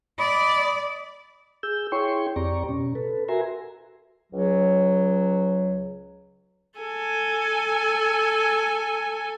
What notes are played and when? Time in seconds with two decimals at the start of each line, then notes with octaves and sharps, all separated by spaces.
0.19 D5 D#5 B5
1.63 G#4 E6 G6
1.92 E4 G#4 C#5 G5 C6 C#6
2.36 F2 C4 G4 D5 A#5 C#6
2.69 B2 C#4
2.95 A4 B4
3.29 F#4 A#4 E5 G#5 A#5 C6
4.32 C#2 F#3
6.79 A4 G#5